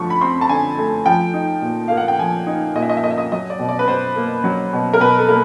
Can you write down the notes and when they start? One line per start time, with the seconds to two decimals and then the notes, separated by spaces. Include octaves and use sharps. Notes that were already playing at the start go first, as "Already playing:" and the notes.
Already playing: D3 F3 A3 C#6
0.10 B5
0.21 C4 C6
0.41 A5
0.49 D3 G#5
0.78 A3
1.06 F3 G5
1.34 D#4
1.62 A#2
1.88 A#3 F5
1.97 F#5
2.08 G5
2.19 F3 G#5
2.47 D#4
2.75 A#2 D#5
2.82 E5
2.89 D#5
2.97 E5
3.03 A#3 D#5
3.11 E5
3.18 D#5
3.32 F#3 D#5
3.50 D5
3.60 B2
3.69 D5
3.79 B4
3.88 B2 C5
4.16 A#3
4.44 F#3
4.73 B2
4.93 A#4
5.01 B2 B4
5.18 A4
5.29 A#3 A#4